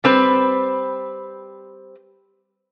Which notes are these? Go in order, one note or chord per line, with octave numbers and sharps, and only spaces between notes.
G3 C4 B4